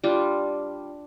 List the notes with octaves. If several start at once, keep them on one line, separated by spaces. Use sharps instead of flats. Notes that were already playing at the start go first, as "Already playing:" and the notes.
G3 D4 F4